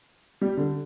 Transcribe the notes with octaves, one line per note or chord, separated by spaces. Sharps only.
G3
D3